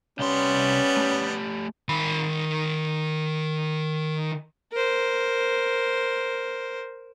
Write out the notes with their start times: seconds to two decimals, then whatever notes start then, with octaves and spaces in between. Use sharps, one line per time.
0.19 C2 G3 B3 C#4 C6
0.97 A3 G4
1.89 D#3 B5
4.72 A#4 C5